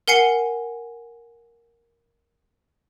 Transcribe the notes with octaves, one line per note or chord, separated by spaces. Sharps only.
A#4 F#5 G#5 C7 C#7 G7